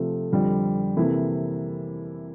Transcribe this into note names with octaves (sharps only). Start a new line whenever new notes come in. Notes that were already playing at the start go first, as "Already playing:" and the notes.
Already playing: C3 F3 A3
F2 D3 G3
C3 E3 A#3 E4 A4